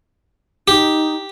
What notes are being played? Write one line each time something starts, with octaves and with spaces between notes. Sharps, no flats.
D#4 G4